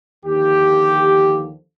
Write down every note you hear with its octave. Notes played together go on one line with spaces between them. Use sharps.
D#2 D3 F3 G4